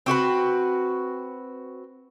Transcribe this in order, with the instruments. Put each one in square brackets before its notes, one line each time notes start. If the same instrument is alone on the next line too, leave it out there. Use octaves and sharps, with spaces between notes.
[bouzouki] C4 F#4 G#4 B4